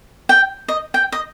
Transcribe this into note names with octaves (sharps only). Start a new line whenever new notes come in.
G5
D#5
G5
D#5